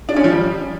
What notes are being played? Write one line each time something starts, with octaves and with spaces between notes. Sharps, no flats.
D4
C#4
F3
G3